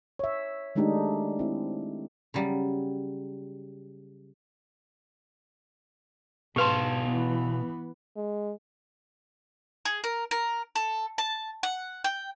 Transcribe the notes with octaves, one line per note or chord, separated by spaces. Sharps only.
C#5 E5
D#3 G#3 A3 D4 D#4 G4
C4 E4
C#3 F#3 G3
G#2 B2 G4 B4 F5 A5 C6
E3 B3
G#3
G#4
A#4
A#4
A4
A5
F#5
G5